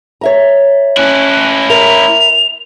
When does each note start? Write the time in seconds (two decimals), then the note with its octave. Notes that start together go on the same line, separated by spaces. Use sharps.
0.21 C#5 E5 A#5
0.97 C#4 E4 F#6
1.70 A#4 E5 A#5 F7